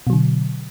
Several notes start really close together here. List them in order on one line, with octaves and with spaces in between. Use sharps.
B2 F#3 D3